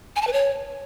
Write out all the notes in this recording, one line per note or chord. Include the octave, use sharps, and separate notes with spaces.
G#5
A5
B4
C#5